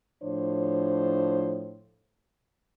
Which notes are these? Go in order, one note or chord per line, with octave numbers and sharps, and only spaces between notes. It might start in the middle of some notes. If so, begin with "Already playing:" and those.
A2 F3 D4 C5 C#5